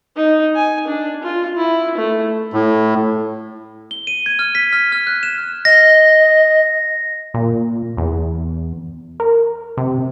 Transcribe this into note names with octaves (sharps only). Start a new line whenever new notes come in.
D#4
G#5
D4
F4
E4
A3
A2
G7
D#7
G#6
F6
B6
F6
F6
F#6
E7
D#5 A#6
A#2
E2
A#4
C3